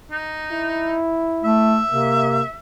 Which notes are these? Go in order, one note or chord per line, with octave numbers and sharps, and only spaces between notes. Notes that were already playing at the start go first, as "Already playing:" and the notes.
D#4
E4
A3 E5
C3 A#3